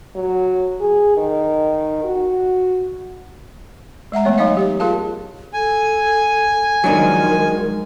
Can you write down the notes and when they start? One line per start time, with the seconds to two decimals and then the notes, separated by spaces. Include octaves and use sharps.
0.15 F#3
0.81 G#4
1.17 D#3
2.04 F#4
4.12 G#3 E5 F#5 A#5
4.25 E3 A3 B3 C#5
4.38 F#3 D#4 C#5 D#5 F5
4.57 G4 C#5
4.80 F4 G#4 A#4 F5 A5
5.53 A4 G#5
6.84 D#3 F3 F#3 G#3 D4 D#4 A#4